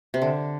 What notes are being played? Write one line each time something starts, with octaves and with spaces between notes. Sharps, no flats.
C3
D3